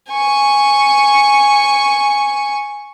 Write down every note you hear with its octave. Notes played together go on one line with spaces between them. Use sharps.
G#5 C#6